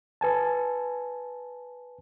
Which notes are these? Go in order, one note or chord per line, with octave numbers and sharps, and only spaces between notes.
B4 G#5 A5